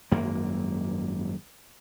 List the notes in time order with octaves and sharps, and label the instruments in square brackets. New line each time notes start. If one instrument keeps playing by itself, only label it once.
[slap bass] G#1 F#2 A#3